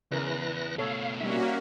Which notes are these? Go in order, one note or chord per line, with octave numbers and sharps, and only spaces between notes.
E2 C#3 E3 A#4 F#6 A#6
B2 A3 A4 C#5 F5
G3 A#3 C#4 D#4 F#4 E5